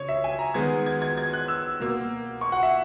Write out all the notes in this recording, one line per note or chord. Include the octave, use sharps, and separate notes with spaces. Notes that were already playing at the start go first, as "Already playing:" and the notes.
Already playing: C#3 C#5
E5
G#5
A#5
D#3 G#3 B3 G#6
G#6
G#6
G#6
F#6
E6
B2 A#3
C#6
F#5
E5